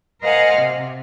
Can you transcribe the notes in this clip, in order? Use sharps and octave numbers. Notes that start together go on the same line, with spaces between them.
A#4 C5 D#5 F5 F#5 G#5
C3